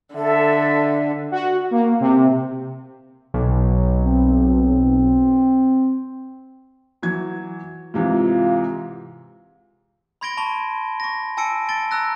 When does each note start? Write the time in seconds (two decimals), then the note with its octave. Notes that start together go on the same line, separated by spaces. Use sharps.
0.15 D3 A4 E5
1.31 F#4
1.71 A#3
2.00 C3
3.34 B1
3.99 C4
7.02 E3 F#3 G#6
7.94 G#2 C3 E3 F4
10.21 B5 C6 G#6 A#6 D7 G7
10.37 A5 B5 C#6 G7
11.00 C#6 A#6
11.37 G#5 A5 E6 C#7 D7
11.69 A6 D7 G7
11.91 A#5 E6 F#6 A#6